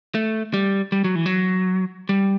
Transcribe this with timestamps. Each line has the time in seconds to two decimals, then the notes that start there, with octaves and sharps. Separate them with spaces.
0.15 A3
0.54 G3
0.92 G3
1.04 F#3
1.15 E3
1.26 F#3
2.09 G3